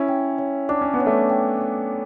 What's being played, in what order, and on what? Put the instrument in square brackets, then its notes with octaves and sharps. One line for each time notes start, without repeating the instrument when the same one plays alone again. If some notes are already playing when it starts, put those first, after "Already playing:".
Already playing: [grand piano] C#4 E4 [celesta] C#5
[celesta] G5
C#5
[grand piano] D4 [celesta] D6
[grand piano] C#4
B3
[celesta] C#5
[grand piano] A3 C#4
[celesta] G5
C#5